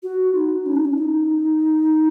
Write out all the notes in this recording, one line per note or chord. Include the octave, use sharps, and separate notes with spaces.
F#4
D#4
C#4
D#4
C#4
E4
D#4